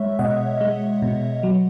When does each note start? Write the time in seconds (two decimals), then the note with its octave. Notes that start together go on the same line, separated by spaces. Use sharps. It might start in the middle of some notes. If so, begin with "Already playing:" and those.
Already playing: G#3 C#5 E5
0.19 B2 D#5 F#5
0.61 G#3
1.02 B2
1.43 F#3